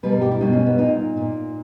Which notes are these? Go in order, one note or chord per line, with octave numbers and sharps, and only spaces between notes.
B2 G3 A#3 B4
A#4
G4
E4
B2 G3 A#3 D#4
C#4
B3
A#2 A#3 D#4
A#2 A#3